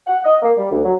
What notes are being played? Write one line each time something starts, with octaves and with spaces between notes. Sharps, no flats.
F#5
D#5
A#3
G3
D2
F#3